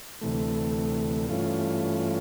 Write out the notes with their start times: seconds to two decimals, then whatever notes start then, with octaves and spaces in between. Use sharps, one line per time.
0.21 D2 C3 E3 A3
1.29 G2 E3 A3 C#4 F4